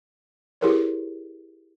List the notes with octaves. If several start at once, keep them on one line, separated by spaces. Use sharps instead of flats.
E4 G4 G#4 A#4 B4 C#5